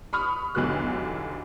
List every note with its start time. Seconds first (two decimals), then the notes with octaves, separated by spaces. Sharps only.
0.13 B5 C#6 D#6 F6
0.55 B1 E2 D3 F#3 G4 F#6